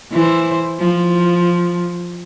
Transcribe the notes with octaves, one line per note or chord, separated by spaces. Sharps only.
E3 E4 C5
F3